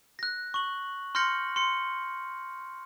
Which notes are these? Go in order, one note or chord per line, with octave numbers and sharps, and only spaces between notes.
F#6 A#6
C#6 F#7
C6 F6 G6 A#6 C#7 F#7
C6 C#7